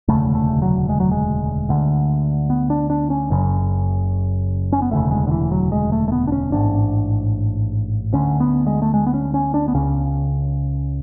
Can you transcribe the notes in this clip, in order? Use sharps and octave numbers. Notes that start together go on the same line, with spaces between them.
E1 D2 C#3 A3
A3
F#3
G#3
F#3
G#3
D2 D3
B3
D4
D4
C#4
F#1 F#2 C#3
C#4
B3
E1 D2 C#3 A3
G#3
D3
E3
F#3
G#3
A3
A3
B3
D4
C#4
A1 G#2 D4
D2 D3 C#4
B3
G#3
A3
G#3
B3
C#4
C#4
D4
B3
C#2 C#3 C#4